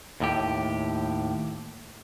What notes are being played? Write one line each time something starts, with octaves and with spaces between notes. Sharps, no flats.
D#2 A2 G4